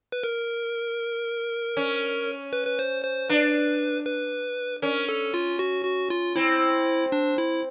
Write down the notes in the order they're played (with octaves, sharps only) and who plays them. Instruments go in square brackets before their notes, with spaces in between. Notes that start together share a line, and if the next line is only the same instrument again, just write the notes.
[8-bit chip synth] B4
A#4
[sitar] C#4
[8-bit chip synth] B4
B4
C5
C5
[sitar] D4 [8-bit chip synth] B4
[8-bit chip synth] B4
[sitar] C#4 [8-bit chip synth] A#4
[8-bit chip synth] A4
F4
F#4
F#4
F4
[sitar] C4 [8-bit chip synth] E4
[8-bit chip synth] D4
E4